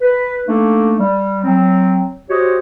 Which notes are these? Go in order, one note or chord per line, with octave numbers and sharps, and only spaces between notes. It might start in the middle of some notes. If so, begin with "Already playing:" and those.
B4
A3 A#3 D4 D#4 A4
G3
F#3 C4
F#4 G4 C5 C#5 D#5